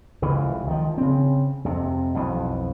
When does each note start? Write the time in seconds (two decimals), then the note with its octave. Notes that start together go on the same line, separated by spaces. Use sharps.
0.22 F1 C#2 C#3 E3
0.67 D#3 F3
0.98 C#3 C4
1.65 F2 C3
2.14 B1 F2 E3